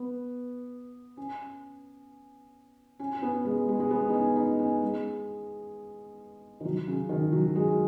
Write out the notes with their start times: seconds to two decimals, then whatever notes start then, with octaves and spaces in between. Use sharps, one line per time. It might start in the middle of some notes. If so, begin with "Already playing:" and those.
Already playing: B3
1.17 C#4
3.00 C#4
3.14 C#4
3.22 B3
3.45 G#3
3.69 G#3
3.80 G#3
3.90 B3
4.09 D#4
4.14 C#4
4.36 D#4
4.59 C#4
4.83 G#3
6.60 D#3
6.65 F#3
6.87 C#3
7.09 D#3
7.32 F#3
7.55 G#3